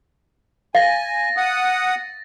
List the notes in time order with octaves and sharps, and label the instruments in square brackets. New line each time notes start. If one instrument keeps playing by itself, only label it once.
[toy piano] F5 [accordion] G#5 [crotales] A6 A#6
[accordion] F#5 D#6